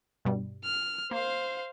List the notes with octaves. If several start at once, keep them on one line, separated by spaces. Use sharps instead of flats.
G2 B2 G3
F6
A#3 C5 F5